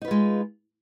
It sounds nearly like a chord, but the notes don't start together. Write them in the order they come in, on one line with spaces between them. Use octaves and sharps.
D#4 B4 F4 G#3